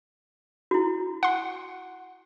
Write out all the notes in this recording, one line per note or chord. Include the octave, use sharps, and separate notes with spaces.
E4 F#4
F#5 C6